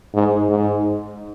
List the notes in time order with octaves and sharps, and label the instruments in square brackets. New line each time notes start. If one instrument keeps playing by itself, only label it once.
[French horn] G#2
G#2